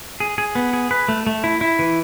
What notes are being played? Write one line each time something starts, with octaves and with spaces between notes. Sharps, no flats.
G#4
G#4
B3
G#4
B4
A3
A3
E4
E4
E3